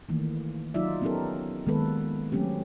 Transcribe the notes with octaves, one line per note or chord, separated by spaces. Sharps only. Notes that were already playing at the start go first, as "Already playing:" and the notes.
D#3 E3 A3 A#3
F#3 D#4 F4 D5 E5
B3 C#4 D#4 G4 A4 A#4
D#3 G#3 A#3 B3 A4 B4
F#3 A3 C4 C#4 G4